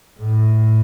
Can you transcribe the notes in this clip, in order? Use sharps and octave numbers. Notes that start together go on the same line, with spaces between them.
A2